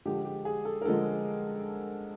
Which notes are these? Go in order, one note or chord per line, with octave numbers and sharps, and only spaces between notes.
D3 F3 G#3 G4
G4
G#4
A4
A#4
D3 F3 G#3 A4